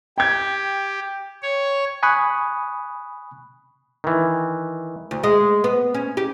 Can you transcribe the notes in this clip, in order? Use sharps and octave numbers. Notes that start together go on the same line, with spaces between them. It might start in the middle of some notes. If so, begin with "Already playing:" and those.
G4 G5 G#6
C#5
G#5 B5 C#6 D#6 F#6
D#3 E3
D2
G#3
B3
C#4
G4